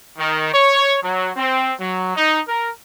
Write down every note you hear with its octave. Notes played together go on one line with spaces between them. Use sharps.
D#3
C#5
F#3
C4
F#3
D#4
A#4